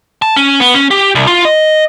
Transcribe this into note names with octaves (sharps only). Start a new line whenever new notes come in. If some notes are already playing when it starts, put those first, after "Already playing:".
A5
C#4
B3
C#4
G4
C2
F4
D#5